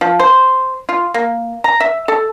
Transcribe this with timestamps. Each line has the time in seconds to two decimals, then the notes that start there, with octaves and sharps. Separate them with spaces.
0.01 F3
0.20 C5
0.89 F4
1.14 A#3
1.64 A#5
1.80 E5
2.08 A4